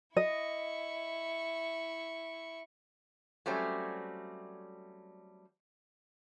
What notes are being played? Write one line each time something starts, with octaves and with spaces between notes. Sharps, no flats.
E4 D#5 C#6
F#3 G3 A3 C4 C#4